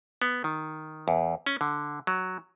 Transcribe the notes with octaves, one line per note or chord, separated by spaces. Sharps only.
B3
D#3
E2
C#4
D3
F#3